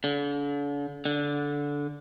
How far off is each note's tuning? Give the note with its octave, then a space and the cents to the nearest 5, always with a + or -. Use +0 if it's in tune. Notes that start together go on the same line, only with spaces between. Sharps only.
D3 -40
D3 -15